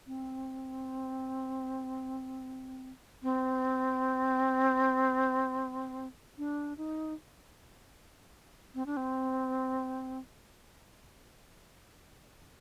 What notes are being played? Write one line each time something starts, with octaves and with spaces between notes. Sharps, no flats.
C4
C4
D4
D#4
C4
D4
C4